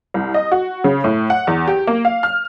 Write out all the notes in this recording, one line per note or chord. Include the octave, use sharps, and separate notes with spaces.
C2
D#5
F#4
C#3
A2
F#5
E2
G4
A#3
F5
F6